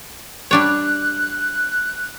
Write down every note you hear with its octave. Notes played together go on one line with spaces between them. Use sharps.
G3 D4 C#5 F#6